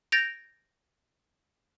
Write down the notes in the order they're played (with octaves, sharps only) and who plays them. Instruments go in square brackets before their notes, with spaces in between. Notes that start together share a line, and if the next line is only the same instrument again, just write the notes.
[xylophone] G6 A6 A#6 D7 F7